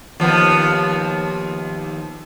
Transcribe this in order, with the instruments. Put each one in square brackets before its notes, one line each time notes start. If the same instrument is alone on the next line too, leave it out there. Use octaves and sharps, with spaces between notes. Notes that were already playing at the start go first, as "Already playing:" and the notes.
[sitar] D#2 F3 B3